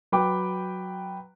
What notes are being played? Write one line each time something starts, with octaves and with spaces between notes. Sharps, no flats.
F#3 B4 G5 D6